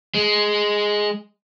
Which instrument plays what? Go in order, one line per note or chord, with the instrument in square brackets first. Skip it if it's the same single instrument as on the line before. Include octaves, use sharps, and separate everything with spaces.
[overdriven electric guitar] G#3